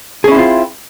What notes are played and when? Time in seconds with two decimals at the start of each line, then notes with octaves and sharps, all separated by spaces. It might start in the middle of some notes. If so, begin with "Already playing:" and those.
0.24 G#4
0.28 C#4
0.31 E4
0.35 C4
0.38 F4